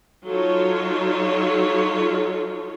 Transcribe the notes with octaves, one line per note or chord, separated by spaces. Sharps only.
F#3 D#4 F4 A4 C#5